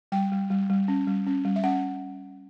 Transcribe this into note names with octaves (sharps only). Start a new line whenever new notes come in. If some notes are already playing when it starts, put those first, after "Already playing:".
G3 G5
G3
G3
G3
C#4
G3
C#4
G3
E5
C#4 F#5